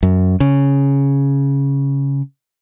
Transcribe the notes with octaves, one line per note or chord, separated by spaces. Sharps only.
F#2
C#3